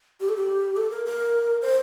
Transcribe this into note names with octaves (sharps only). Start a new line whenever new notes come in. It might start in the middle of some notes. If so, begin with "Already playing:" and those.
G4
A4
G4
A4
A#4
A#4
C5